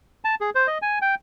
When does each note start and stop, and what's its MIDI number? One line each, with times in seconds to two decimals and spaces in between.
0.25 0.35 81
0.41 0.50 68
0.55 0.67 72
0.67 0.78 75
0.82 0.99 80
1.02 1.15 79